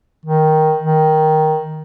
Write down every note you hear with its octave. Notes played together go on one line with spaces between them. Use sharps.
D#3
D#3